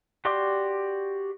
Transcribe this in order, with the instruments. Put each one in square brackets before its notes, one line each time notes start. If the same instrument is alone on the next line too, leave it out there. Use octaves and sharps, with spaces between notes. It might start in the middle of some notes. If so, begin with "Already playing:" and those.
[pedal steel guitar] F#4 G4 D5 C6